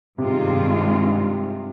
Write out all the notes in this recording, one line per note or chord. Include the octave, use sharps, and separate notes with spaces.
G2 C3 D#3 G#3 C4 F4
C3